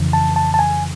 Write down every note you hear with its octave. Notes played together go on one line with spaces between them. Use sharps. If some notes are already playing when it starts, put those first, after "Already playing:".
Already playing: F2 C#3 E3
A5
A5
A5
G#5